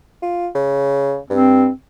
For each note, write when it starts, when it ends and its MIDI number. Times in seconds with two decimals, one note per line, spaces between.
0.22 0.48 65
0.55 1.18 49
1.30 1.67 43
1.30 1.69 60